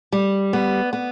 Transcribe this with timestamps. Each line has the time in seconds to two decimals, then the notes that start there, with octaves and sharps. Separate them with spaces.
0.12 G3
0.53 B3
0.93 B3